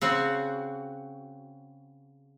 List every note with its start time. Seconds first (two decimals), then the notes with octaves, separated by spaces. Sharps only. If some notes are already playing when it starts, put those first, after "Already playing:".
0.01 C#3 C4 F#4